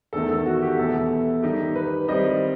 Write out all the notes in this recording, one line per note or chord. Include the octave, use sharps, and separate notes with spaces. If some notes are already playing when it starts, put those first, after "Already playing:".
E2 D#3 A3 A4
A4
F#4
G4
E2 B2 A3 E4 A4
D#3 G3 D#4 G4
B4
D#3 G3 C4 E4 D#5